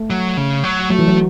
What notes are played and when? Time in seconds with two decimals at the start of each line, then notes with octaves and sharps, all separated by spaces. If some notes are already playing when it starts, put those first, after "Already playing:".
Already playing: A3
0.10 F#3
0.37 C#3
0.64 F#3
0.90 F#3 A3
0.99 E3
1.08 F#3